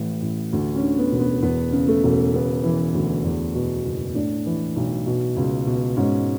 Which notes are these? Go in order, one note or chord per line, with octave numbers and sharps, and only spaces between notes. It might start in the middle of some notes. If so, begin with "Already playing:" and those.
Already playing: A1 A2 E3
A1
D2
C#4
D3
B3
E1
B3
E2 B3
C#3
A3
E1
C#3 B3
E3
D2
E2
B2
F#1
A2 D4
E3
B1
B2
C#2
B2
G#2 C#4